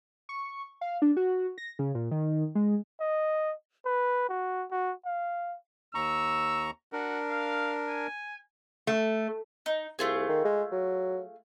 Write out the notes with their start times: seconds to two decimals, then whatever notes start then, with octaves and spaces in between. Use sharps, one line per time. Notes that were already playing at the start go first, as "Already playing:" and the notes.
0.29 C#6
0.81 F5
1.02 D4
1.17 F#4
1.58 A#6
1.79 C#3
1.95 A#2
2.11 D#3
2.55 G#3
3.00 D#5
3.86 B4
4.29 F#4
4.71 F#4
5.05 F5
5.95 D#2 A#5 C#6 E6
6.93 D4 F#4 A#4
7.30 F5
7.89 G#5
8.87 A3
9.66 D#4
9.99 C2 A3 F4 G#4
10.29 D#3
10.45 G#3
10.71 F#3